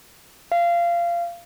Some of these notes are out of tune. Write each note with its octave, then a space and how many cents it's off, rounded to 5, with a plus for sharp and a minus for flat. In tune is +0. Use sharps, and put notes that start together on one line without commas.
F5 -20